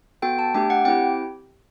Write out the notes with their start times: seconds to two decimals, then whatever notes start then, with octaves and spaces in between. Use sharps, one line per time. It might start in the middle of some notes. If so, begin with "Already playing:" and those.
0.22 B3 F#4 A4 G5
0.39 A5
0.54 A3 D4 G4 G5
0.70 F#5
0.85 C4 E4 G4 G5